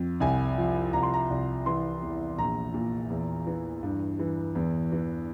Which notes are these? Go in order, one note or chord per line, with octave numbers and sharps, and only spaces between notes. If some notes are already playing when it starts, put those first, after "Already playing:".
Already playing: F2
C2 G#5
F3
C2 A#5
C6
A#5
C2
E3 C6
E2
A#1 A#5
A#2
E2
E3
G2
E3
E2
E3